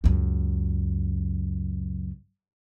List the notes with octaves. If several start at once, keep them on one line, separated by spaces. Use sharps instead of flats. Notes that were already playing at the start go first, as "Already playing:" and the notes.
C#2 F#2